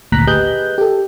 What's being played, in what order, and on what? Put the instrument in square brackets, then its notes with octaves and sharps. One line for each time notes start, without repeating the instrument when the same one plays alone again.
[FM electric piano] G#1 D2 A#2 A#5 F#6 B6
G4 G#4 B4 D#5 F#6 G6
G4 A4